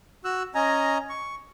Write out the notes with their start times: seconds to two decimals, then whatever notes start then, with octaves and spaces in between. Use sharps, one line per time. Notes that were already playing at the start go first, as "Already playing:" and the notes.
0.25 F#4 E6 F#6
0.55 C#4 D#5 G#5 A#5
1.10 C#6